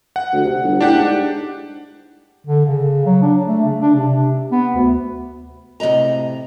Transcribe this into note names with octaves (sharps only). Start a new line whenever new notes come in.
F#5
D2
C3
G1
A2 D4 G4 F#5
G#2
D3
C#3
F#3
D4
A3
C#3
D4
C3
B3
D2
A2 C3 G#3 D#5 A#5